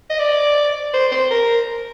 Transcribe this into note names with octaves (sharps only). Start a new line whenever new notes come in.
D#5
D5
C5
C5
A#4